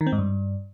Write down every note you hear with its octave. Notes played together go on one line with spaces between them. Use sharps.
D#3
C4
G#2
G2